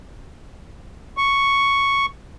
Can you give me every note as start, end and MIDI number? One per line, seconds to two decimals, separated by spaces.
1.17 2.06 85